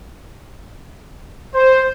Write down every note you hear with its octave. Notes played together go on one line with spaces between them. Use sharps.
C5